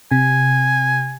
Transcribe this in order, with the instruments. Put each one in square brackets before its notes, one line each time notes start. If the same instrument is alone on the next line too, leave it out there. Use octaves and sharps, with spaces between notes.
[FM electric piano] C3 [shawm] G#5